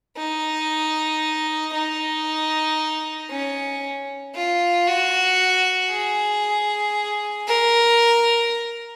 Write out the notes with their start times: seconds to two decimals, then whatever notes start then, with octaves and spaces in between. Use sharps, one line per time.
0.17 D#4
1.74 D#4
3.30 C#4
4.35 F4
4.87 F#4
5.90 G#4
7.48 A#4